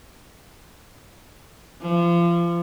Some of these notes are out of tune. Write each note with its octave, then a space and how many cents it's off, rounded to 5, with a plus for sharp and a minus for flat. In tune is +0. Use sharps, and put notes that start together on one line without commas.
F3 -30